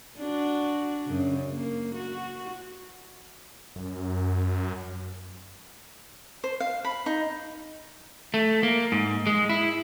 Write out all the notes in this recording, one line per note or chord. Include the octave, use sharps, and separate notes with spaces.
D4 F#4
F#2 C#3
A#3
F#4
F#2
C5
F5
B5
D#4
A3
A#3
G#2
G#3
E4